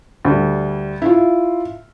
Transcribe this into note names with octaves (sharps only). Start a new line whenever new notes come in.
D2 G3
E4 F4